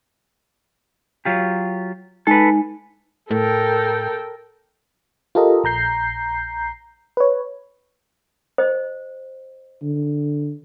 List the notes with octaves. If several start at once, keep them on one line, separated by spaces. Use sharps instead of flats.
F#3 F4 G4
G#3 D#4 A4 B4 G#5
A2 A4 A#4 G5
F4 G4 A4 A#4 D#5
A#1 A#5 G6 C7
B4 C#5
C5 D#5
D3